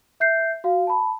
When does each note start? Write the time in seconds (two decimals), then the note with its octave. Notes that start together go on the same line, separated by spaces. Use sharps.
0.20 E5 G6 C7
0.64 F#4 F5
0.87 A5 B5